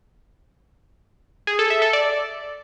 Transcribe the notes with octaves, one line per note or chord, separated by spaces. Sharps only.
G#4
A4
E5
A4
D5